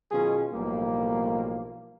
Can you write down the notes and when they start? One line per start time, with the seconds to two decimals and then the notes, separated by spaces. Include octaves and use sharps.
0.11 B2 D#3 F#3 C#4 F4 G#4
0.53 B1 A2 F3 G3 A#3